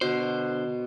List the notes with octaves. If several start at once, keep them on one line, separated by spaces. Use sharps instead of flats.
B2 D3 C5